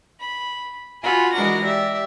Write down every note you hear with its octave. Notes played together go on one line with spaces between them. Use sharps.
B5
F4 F#4 G#5 B5
E3 G#3 D4 F#4 A#4 A#6
G4 D5 E5